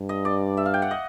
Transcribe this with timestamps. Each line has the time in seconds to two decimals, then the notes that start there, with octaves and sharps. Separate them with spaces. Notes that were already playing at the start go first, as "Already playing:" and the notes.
Already playing: G2
0.09 D#5
0.25 D5
0.57 E5
0.65 F5
0.74 G5
0.82 F#5
0.91 D#5